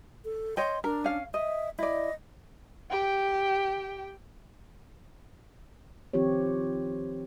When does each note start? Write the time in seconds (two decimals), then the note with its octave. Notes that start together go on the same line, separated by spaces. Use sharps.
0.25 A4
0.57 C#5 D#5 G5 C6
0.84 D4 A#4
1.04 C#4 F5
1.34 D#5 E5
1.79 E4 D5 D#5
2.90 G4 G5
6.13 D#3 F3 C4 F4 G4 C#5